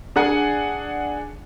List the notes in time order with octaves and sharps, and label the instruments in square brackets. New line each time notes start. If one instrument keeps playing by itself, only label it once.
[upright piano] D4 G#4 F#5 G#5